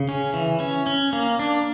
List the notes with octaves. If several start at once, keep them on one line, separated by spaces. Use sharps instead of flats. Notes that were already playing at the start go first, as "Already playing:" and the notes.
Already playing: C#3
C#4
E3
C#4
C#4
A#3
D4